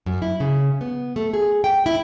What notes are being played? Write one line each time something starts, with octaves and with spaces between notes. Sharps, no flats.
F#2
E4
C#3
B3
A3
G#4
G5
E4